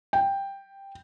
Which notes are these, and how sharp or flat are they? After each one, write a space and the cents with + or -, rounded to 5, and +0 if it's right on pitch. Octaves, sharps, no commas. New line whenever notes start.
G5 +5